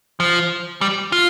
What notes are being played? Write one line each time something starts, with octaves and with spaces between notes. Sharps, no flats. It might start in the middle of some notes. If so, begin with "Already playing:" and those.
F3
G3
F4